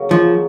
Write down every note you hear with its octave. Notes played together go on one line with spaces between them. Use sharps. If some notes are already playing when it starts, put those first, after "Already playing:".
Already playing: C#3 F#3 A#3
F3 G#3